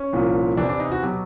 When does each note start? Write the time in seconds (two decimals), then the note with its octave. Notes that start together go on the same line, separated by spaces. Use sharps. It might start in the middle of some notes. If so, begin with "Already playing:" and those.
Already playing: C#4
0.13 C2 A#2 F3
0.57 E2 C3 E3 D4
0.69 D4
0.80 D#4
0.92 F#4
1.03 B2 F#3 G4